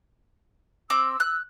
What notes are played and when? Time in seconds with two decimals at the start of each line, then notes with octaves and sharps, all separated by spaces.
0.90 C4 D6 E6
1.20 F#6